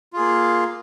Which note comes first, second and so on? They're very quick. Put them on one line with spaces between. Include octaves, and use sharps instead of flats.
F4 G#4 A#3